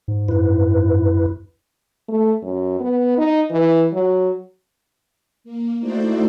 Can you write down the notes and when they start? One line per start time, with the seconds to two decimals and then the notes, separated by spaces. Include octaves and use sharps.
0.08 G#2
0.29 F#2 E4 B4
2.09 A3
2.42 F#2
2.80 B3
3.18 D#4
3.50 E3
3.93 F#3
5.44 A#3
5.80 A3 D#4 E4 F#4 C5 D5